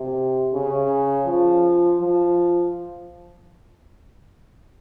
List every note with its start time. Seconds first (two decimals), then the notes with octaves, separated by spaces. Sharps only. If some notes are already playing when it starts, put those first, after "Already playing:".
Already playing: C3
0.54 C#3
1.26 F3
2.00 F3